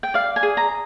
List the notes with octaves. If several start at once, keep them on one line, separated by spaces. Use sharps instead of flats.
G5
D5 F5
G#5
G#4
A#5